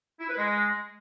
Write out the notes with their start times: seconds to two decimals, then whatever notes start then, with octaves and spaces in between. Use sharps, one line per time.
0.20 E4
0.29 B4
0.37 G#3